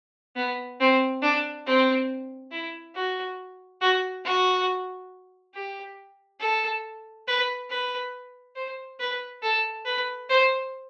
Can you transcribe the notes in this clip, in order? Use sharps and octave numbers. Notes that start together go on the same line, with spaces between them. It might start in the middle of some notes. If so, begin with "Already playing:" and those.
B3
C4
D4
C4
E4
F#4
F#4
F#4
G4
A4
B4
B4
C5
B4
A4
B4
C5